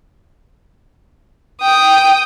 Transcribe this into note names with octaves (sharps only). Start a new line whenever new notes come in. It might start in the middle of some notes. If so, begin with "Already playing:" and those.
G5 D#6